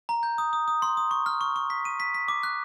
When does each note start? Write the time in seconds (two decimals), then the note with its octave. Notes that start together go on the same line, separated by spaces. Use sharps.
0.09 A#5
0.23 G6
0.38 D#6
0.53 D#6
0.68 D#6
0.82 C6
0.97 D#6
1.11 C#6
1.26 F6
1.41 C#6
1.56 C#6
1.70 B6
1.85 D#7
2.00 B6
2.14 B6
2.28 D6
2.43 F#6